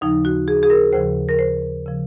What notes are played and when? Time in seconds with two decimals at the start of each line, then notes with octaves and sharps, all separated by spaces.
0.01 D#2 C#3 F3 D#4
0.25 F#4
0.48 G#4
0.63 G#4
0.70 A#4
0.93 D#2 C#3 F3 C5
1.29 A#4
1.39 C5
1.86 C#3 F3